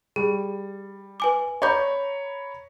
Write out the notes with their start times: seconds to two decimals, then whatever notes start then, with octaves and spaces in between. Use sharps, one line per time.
0.16 G3 G#4
1.20 B4 G#5 D6
1.62 C#5 A#5 B5 C#6 D6 G6